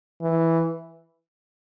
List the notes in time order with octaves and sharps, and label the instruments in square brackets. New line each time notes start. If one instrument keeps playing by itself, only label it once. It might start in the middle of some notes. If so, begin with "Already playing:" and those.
[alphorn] E3